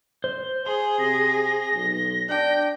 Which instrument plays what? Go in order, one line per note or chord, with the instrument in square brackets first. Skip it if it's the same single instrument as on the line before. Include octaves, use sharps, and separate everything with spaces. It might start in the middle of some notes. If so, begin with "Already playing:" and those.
[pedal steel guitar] C5
[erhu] G#4 [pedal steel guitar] C6
[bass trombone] C3 [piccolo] A#6
[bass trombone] B1
[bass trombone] D4 [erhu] G5